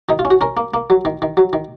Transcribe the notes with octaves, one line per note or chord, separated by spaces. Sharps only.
D#3 D#4
F4
C#4
F#4
C#4 A#4
A#3
A#3
F#3
D#3
D#3
F#3
D#3